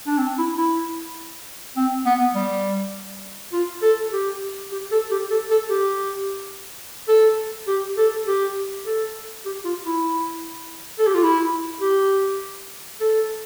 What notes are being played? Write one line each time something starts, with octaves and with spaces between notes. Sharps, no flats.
D4
C4
E4
E4
C4
B3
G3
F4
A4
G4
G4
A4
G4
A4
A4
G4
A4
G4
A4
G4
A4
G4
F4
E4
A4
G4
F4
E4
G4
A4